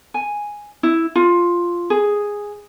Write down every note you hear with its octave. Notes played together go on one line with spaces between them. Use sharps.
G#5
E4
F4
G#4